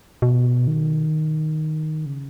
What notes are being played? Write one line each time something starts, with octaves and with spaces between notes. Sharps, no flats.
B2
D#3
C#3